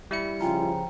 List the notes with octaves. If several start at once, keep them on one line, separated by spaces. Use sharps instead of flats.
G3 E4 C#7
C#3 F3 F4 G5 G#5 A#5